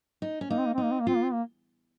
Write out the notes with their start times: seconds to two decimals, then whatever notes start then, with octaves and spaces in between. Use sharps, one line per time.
0.22 D#4
0.41 C#4
0.50 A#3 D#4
0.58 C4
0.66 A#3
0.74 C4
0.78 D#4
0.83 A#3
0.91 C4
1.00 A#3
1.07 C4 F4
1.16 A#3
1.24 C4
1.33 A#3